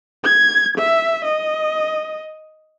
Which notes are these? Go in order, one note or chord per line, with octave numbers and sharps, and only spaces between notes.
G#6
E5
D#5